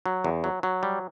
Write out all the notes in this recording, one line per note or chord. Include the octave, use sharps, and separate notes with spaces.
F#3
E2
F#3
F#3
G3